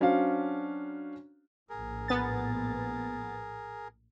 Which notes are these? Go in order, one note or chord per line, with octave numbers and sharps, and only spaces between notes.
F#3 C#4 D4 F#4 C5 F5
A#1 A2 G#4 A#4
B3 A6